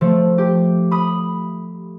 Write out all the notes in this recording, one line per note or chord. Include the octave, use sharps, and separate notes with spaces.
F3 A3
G4
B5 D#6